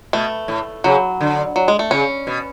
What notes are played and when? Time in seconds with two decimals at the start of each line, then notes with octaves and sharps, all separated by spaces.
0.13 B2 A3
0.48 A2
0.84 C#3 F#3
1.21 D3
1.56 F#3
1.68 G#3
1.79 A3
1.91 C#3 C#4
2.27 B2